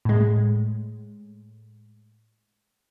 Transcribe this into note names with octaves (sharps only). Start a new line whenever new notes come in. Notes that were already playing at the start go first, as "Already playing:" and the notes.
A2 G#3